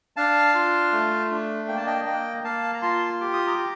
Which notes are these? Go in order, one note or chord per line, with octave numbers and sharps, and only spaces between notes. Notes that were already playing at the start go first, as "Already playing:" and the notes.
D4 F5 A5
F4
A3
D4
A#3 G5
A5
D#5 G5
A#3 D#5 G5
A#3 F5 A5
A#5
F4 A5 C6
G4 D6
D#6
A#5 D6
G4